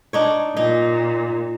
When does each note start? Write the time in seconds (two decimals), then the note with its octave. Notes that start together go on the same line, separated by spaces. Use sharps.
0.13 D4 D#4 C#5
0.57 A#2 D#4